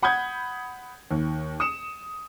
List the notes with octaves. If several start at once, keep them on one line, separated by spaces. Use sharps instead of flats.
F#5 B5 D#6 G6 G#6
D#2
D#6 C#7 E7